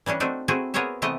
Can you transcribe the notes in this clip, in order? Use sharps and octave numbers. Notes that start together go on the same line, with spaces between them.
E3 G3 C#4 D4
A3 C4 D4 D#4 F#4
A3 C4 E4 F#4 G#4
B3 G#4 A#4 C5 C#5 E5
C3 E3 A3 B3 G4 D#5